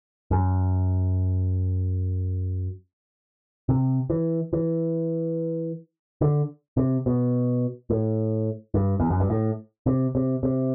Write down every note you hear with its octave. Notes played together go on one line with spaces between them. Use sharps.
F#2
C3
E3
E3
D3
C3
B2
A2
G2
E2
F#2
G2
A2
C3
C3
C3